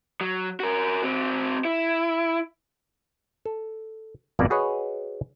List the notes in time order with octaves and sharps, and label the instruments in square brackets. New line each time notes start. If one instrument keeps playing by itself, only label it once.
[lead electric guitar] F#3
F#4 A#4
C4 F#4
E4
[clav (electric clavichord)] A4
G#1 F2 B2 A#3 D5
F#4 G#4 B4 C#5 D#5